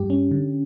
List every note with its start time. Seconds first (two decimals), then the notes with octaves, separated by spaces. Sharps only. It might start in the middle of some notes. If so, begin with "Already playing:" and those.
Already playing: G2 G4
0.10 C#4
0.31 D3